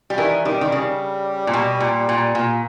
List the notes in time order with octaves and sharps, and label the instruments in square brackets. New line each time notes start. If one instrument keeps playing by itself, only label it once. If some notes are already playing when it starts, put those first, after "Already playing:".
[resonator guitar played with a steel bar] G3
[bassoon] D#3 [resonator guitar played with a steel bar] E3
[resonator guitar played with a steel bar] D#3 [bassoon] G3
[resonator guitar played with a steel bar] D#3
[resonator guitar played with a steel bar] C#3 [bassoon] G3
[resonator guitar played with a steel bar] A#2
B2
A#2
A#2
A#2